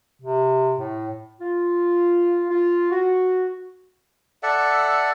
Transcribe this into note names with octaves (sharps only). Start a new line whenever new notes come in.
C3
A2
F4
F4
F#4
A4 D5 E5 F#5